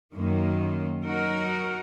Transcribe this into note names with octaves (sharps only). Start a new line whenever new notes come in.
F#2 D#3 A#3
F#3 D#4 F#4 A#4